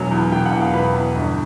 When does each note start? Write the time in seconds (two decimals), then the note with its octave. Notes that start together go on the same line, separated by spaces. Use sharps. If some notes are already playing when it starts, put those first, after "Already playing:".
Already playing: E1 B2 F#3 G#5
0.11 E2
0.32 E1 G5
0.46 F#5
0.53 E2
0.61 F5
0.74 E1 B4
0.94 E2
1.16 G1